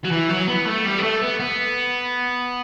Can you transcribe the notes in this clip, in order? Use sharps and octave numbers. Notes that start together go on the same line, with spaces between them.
F#3
E3
F#3
B3
A3
G3
B3
A3
B3
B3